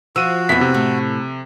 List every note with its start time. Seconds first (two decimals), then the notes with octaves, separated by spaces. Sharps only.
0.16 F3 F#4 E6 D#7
0.49 F2 B3 E4 B6
0.61 C3
0.74 A2